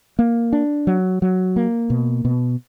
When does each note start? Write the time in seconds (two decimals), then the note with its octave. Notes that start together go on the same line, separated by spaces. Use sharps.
0.19 A#3
0.53 D4
0.87 F#3
1.22 F#3
1.56 A#3
1.90 B2
2.25 B2